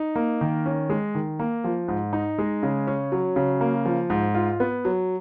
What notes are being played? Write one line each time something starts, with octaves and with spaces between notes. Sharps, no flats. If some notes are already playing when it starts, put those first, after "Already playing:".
Already playing: D#4
A#3
D#3
C#4
G#3
D#3
A#3
F3
G#2
D#4
G#3
C#3
C#4
F#3
C#3
A#3
F3
G#2
F4
B3
F#3